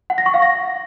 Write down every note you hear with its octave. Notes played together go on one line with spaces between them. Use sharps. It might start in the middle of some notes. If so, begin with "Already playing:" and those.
F#5
A#6
C#6
F5
A#6